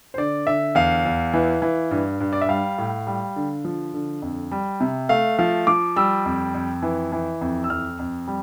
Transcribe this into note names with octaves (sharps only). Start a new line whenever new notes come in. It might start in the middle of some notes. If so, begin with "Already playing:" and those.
C5
D3 D5
D3 E5
E2 F5
E2
E3
E3
G2
G2
D5
E5
G3 F5
A2
G3
D3
F3
D3
F2
G3
C3
A3 F5
F3 F5
F3 D6
G3 E6
F2
F2
E3
E3
F2
E6
F2 F6
F2
G3